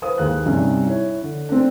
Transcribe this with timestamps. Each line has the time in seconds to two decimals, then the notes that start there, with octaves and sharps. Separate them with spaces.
0.02 B4 C5 F5 D#6
0.18 D#2 G#3 F#6
0.46 G2 C3 C#4 D#4
0.84 E4 C#5
1.22 D3
1.49 C4 D4